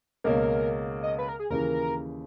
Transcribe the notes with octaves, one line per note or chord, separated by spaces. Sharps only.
C#2 B2 A#3 C#4 A#4
D#5
B4
A#4
G#4
D#2 C#3 E3 A#4